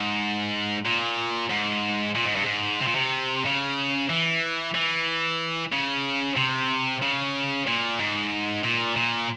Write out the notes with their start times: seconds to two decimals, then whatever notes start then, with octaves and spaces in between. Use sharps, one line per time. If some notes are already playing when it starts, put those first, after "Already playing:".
Already playing: G#2
0.86 A#2
1.50 G#2
2.15 A#2
2.26 G#2
2.35 G2
2.45 G#2
2.81 C3
2.87 A#2
2.95 C3
3.45 C#3
4.10 E3
4.75 E3
5.73 C#3
6.37 C3
7.02 C#3
7.67 A#2
7.99 G#2
8.64 A#2
8.96 A#2